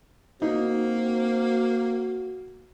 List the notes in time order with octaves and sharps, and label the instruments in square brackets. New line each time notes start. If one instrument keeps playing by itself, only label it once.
[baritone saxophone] A#3 [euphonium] C4 [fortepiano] D#4 [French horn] F#4